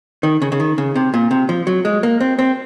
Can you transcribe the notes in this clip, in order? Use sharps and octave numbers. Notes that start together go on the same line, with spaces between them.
D#3
C#3
C#3
D#3
C#3
C3
A#2
C3
F3
F#3
G#3
A#3
C4
C4